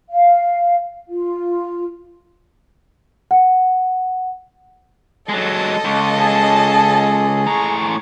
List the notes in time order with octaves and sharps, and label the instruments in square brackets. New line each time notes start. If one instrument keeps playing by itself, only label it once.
[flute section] F5
F4
[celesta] F#5
[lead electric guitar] F#3 G#3 [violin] A4 D#5 [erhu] A5
[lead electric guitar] C#2
[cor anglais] G#4 [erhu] A5
[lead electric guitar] A2 A#5 [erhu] C#6